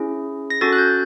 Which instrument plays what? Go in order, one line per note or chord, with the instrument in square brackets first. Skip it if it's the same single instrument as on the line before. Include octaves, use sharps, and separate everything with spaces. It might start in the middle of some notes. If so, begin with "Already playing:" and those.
Already playing: [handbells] C#4 E4 G#4
A#6
C#4 F#4 A4 A6
F#6
G6